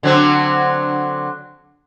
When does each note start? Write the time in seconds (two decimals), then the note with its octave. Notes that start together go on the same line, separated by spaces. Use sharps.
0.03 D3 F#3 C4